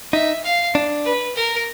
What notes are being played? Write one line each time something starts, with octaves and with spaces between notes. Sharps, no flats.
D#4 E5
F5
D4
B4
A#4